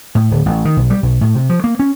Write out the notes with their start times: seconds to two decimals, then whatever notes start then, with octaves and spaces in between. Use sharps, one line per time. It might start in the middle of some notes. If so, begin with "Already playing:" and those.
0.15 A2
0.31 D1
0.46 A1
0.65 D#3
0.77 B1
0.90 G3
1.03 B1
1.21 A2
1.35 C3
1.49 F3
1.64 A#3
1.79 C#4